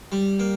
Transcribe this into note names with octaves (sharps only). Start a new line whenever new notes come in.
G3
A#3